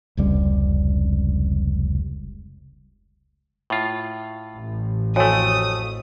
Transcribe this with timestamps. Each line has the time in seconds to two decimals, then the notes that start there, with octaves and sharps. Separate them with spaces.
0.17 F1 C#2 G3
3.70 A2 F4
4.55 A1
5.16 F2 A3 F#4 C#5 G#5 D#6